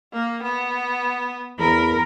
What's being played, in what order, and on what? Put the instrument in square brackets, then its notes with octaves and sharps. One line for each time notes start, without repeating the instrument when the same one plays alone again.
[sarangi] A#3
B3
[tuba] E2 [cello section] A#4 [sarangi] B5